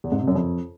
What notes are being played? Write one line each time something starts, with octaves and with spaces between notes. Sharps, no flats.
E2
G#2
C3
F#2
F2